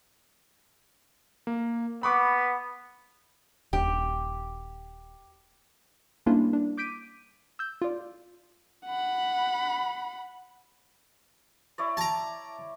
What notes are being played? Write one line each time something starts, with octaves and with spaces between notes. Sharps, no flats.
A#3
B3 B5 C#6 D6
D#1 G4
G3 A#3 C#4 D4 E4 F4
D4
D6 G6 B6 D7 D#7
E6 G6
F4 D5
F#5 B5
E4 C#5 D5
A5 A#5